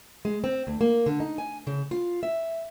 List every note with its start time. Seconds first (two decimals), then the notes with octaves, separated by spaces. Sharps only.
0.25 G#3
0.44 C4
0.67 D2
0.81 A#3
1.06 D3
1.20 D#4
1.38 G#5
1.67 C#3
1.91 F4
2.23 E5